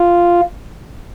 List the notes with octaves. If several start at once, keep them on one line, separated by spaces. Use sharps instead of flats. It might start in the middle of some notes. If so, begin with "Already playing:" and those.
Already playing: F4